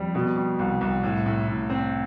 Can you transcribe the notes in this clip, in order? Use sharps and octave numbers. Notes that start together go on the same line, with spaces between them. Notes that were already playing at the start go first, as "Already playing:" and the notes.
Already playing: F2 G3
B2
G3
C2
C2
A2
A2
A2
C4